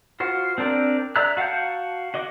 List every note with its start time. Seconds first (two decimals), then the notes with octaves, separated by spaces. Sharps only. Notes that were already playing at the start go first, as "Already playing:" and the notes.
0.20 F4 F#4 C5
0.58 C4 D4 A#4 D5
1.16 D5 E5 A#5 E6 F#6
1.37 F#4 F5 F#5 A5 G6
2.14 F#4 D#5 D6